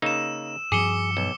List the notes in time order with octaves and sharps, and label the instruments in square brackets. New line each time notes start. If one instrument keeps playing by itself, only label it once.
[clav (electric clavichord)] C#3 A#3 D#4 [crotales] E6 E7
[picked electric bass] G2 F3 [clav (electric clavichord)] G#4 [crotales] D6 C#7 G7
[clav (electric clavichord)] B1